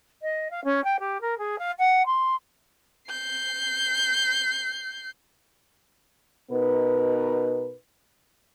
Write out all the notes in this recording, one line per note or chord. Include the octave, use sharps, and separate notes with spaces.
D#5
F5
C#4
G5
G4
A#4
G#4
F5
F#5
C6
G6 C7
B2 B3 D#4 A#4 B4